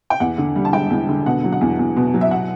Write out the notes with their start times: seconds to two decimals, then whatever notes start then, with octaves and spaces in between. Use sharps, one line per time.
0.10 G5
0.20 E2 F#5
0.38 D3
0.56 G3
0.65 A5
0.73 E1 G5
0.90 E2
1.09 D3
1.26 B2 F#5
1.44 F#3
1.52 F#5
1.61 E2
1.79 E2
1.97 B2
2.14 F#3
2.21 E5
2.31 F#5